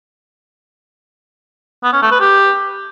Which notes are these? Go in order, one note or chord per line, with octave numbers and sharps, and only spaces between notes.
B3
C#4
A3
B4
G4